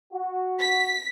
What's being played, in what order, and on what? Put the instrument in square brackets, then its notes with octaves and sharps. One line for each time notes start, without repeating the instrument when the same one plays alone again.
[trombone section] F#4
[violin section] B6